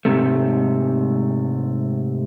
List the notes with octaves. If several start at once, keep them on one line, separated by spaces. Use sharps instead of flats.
G#2 C3 A3